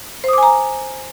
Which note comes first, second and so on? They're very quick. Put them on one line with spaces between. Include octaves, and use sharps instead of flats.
C5 D#6 D6 G#5 A#5